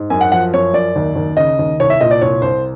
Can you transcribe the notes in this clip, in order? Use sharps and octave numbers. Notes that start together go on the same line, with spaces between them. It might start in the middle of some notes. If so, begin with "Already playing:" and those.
Already playing: G#2
F#2 G#5
F#5
F3 F#5
F#2 C#5
F#2 D5
D#2
D#2
C#3 D#5
D#2
C2 C#5
E5
A#2 D#5
D5
C2 C#5
C2 C5